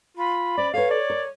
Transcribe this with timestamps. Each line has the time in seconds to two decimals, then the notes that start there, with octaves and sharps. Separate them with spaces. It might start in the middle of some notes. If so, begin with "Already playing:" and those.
0.17 F4 B5
0.57 C#4 C5 D5
0.74 A4 B4 C#5 F5
0.91 D5
1.10 A#4